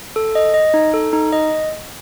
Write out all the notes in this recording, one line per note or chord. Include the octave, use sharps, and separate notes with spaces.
A4
D#5
D#5
D#4
A4
D#4
D#5